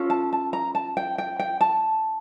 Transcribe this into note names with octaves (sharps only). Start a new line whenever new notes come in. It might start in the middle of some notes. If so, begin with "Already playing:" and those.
Already playing: C#4 F4 A4
A5
A5
A#5
A5
G5
G5
G5
A5